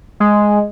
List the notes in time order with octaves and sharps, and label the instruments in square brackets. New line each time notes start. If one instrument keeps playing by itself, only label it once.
[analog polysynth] G#3